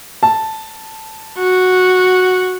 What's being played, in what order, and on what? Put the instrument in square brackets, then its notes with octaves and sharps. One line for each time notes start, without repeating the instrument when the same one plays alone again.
[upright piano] A5
[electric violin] F#4